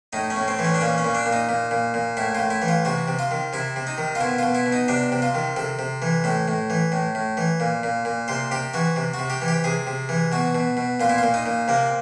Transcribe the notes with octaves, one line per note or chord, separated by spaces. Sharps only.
A2 D#4
C#4
A2
C4
E3
C#4
D4
A#2 C#4
C#4
A#2
D4
A#2
D#4
A#2
A#2
A#2
A2 E4
A2 F4
E4
E3
F4
C3 F#4
C3
F4
D#3
C3 E4
C3
D#4
D#3
F4
B2 E4
B2 F4
E4
B2
D#4
C3 D4
C3
F4
D#3
C3 A4
C3
E3
A2 A4
A2
E3
A2
A2
E3
A#2
A#2
A#2
C3 C5
C3 G4
E3 F#4
C3
F#4
C3
G4
E3
G4
C3 G#4
C3
E3
B2 F#4
B2
B2
A#2 F4
E4
A#2 F4
D#4
A#2
C3 A#3